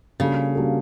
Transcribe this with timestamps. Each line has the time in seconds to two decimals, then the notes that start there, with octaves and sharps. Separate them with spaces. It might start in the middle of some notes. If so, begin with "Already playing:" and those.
0.19 C#3 G3 A#3 D4 F#4 A4
0.55 G3 A#3 D4 F#4 A4